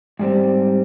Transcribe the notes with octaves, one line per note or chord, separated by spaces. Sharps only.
G#2 G3 C4